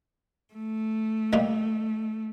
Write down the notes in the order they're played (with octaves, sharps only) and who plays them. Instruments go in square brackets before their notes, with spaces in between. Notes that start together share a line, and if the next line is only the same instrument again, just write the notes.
[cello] A3
[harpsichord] D#3 G3 A#3 D#4